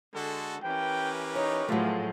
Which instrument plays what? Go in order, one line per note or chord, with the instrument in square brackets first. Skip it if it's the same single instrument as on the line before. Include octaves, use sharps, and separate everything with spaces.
[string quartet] D3 [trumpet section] G#3 F#4 A4
[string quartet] E3 C#4 [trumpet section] G4 A#4 B4 [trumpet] G5
[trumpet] D#4 [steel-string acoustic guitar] C#5
[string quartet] A2 F3 G#3 [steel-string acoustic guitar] F#3 A3 [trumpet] F4